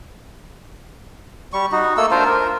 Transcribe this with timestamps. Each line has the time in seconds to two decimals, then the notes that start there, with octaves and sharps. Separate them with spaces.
1.53 G3 C#6
1.72 D#4 F#4
1.97 A3 A#3 A4 E6
2.11 D4 F4 A#4 C5
2.26 A#4